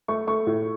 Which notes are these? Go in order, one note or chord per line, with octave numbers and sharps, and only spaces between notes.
A3 C#6
A3 C#6
A2